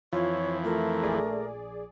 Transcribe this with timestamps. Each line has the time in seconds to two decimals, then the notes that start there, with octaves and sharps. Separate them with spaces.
0.13 F2 E3 F4 C#5
0.65 A3 A#4
1.02 A#1 G#4 D5